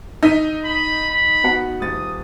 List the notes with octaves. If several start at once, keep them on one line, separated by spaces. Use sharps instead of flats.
D#4 E6 B6 D#7
B5
B5
B3 F#4 F#5
D#1 D#6 A6